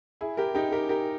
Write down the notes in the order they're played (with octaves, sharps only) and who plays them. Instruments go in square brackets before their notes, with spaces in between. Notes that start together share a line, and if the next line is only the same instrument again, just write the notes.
[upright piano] E4 G#4
G4 A#4
D#4 G4
G4 A#4
G4 A#4